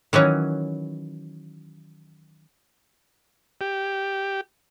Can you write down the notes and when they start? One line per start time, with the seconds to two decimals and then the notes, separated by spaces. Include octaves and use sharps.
0.13 D#3 E3 F#3 C#4
3.61 G4